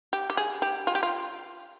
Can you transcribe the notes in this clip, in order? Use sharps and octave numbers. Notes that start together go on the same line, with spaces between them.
G4
G4
G#4
G4
F4
G4
F4